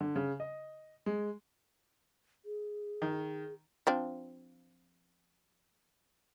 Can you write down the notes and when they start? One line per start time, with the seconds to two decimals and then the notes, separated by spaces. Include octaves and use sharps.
0.01 D3
0.16 C#3
0.40 D#5
1.06 G#3
2.45 G#4
3.02 D#3
3.87 F3 C4 D4